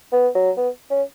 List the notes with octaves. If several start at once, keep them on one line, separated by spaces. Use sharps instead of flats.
B3
F#3
B3
C#4